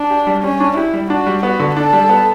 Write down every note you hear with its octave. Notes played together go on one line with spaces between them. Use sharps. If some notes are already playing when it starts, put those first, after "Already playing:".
Already playing: D4
G4
G3
G3 C#4
D4
E4 G4
G3
D4 F#4
G3
B3 F#4
D3
D4 A4
G3
B3